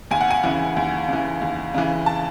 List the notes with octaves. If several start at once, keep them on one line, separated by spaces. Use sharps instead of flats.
D#2 G#5
F#5
G#5
C#3 E3
D#2
C#3 E3
D#2
C#3 E3
A5